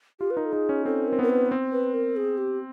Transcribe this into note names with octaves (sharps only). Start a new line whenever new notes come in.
F4 G4
B4
D#4 A#4
A4
D#4 G#4
C#4
C4 A4
A#4
C4
B3 A#4
B4
C4
B4
A#4
G#4
G4